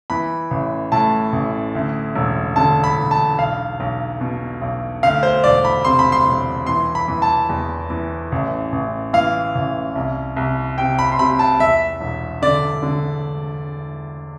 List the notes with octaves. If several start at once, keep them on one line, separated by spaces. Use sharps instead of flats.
E3 B5
A1
A2 A5
A1
D2
E1
D3 A5
B5
E1
A5
B1 F5
B1
B2
B1
D2 F5
C5
E1 D5
B5
C3 C6
B5
C6
E1
E3 C6
B5
E3
A5
E2
E3
A1
A1
E3 F5
A1
C2
C2
C3 G5
B5
C6
C3 B5
A5
E2 E5
E1
D3 D5
D3